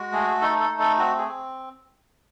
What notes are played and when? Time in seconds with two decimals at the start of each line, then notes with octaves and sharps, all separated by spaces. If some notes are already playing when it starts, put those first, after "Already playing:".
Already playing: G#3 F#4
0.12 A3 G#4
0.41 D#4 A4
0.60 A4
0.70 A3
0.79 A4
0.99 C4 F#4
1.18 G#4
1.28 C4